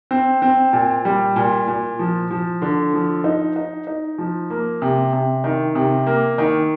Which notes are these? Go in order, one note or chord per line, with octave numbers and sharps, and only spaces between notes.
C4
C4
A#2
G3
A#2
A#2
F3
F3
D3
F3
D#4
D#4
D#4
F3
A#3
C3
C3
D#3
C3
A#3
D#3